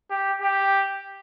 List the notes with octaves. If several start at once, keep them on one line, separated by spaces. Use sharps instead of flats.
G4
G4